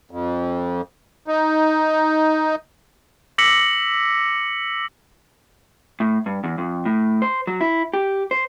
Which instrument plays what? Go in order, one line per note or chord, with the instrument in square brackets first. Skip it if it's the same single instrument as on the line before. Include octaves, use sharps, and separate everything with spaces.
[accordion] F2
D#4
[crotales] D6 E6 A#6 B6 C#7 F#7
[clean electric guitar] A2
G2
E2
F2
A2
C5
F#3
E4
G4
C5